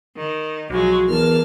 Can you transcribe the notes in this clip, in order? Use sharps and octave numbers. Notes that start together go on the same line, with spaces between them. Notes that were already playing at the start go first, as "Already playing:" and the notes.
D#3
B1 F3 F#3 G#3 F#4
E2 A#4 A5 F6